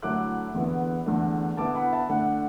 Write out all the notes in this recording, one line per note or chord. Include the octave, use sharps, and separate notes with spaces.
D3 F#3 A3 E4 D6 F#6
E2 D3 B3 E4
E2 D3 A3 D4
D3 B3 E4 A5 D6
F#5 B5
E5 A5
D3 A3 D4 F#5